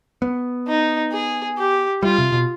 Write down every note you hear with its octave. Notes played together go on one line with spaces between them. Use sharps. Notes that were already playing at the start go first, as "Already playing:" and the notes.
B3
D#4
G#4
G4
G3 F4
C3
B2